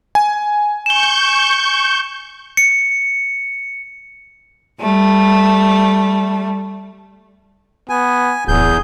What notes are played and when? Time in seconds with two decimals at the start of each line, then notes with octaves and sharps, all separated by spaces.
0.15 G#5
0.86 C#6 G6 E7 G7
2.57 C#7
4.80 G3 A3
7.89 B3 G#5
8.48 D1 E2 G#4 G6